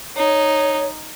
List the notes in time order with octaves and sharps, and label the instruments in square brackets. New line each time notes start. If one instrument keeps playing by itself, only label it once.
[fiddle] D#4 [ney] C#5